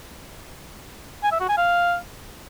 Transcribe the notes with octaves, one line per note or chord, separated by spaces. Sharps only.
G#5
E5
F#4
G#5
F5